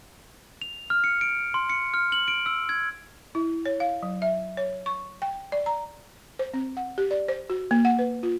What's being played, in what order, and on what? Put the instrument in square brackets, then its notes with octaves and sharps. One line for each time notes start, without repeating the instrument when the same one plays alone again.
[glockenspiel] F7
F6
C#7
D7
C6
C#7
F6
F#7
D7
E6
G#6
[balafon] E4
C#5
F5
F#3
E5
C#5
C#6
G5
D5
A#5
C5
C4
F#5
G4
D5
C5
F#4
A#3
F#5
B4
F4